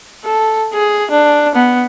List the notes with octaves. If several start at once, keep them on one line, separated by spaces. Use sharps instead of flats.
A4
G#4
D4
B3